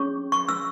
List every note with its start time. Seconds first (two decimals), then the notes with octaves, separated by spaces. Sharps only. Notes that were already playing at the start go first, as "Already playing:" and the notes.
Already playing: C#4 G#4 C#5 C#6
0.32 C#6
0.49 E6